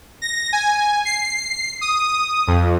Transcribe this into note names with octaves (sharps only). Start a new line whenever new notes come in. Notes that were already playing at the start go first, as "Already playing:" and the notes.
A#6
G#5
C7
D#6
F2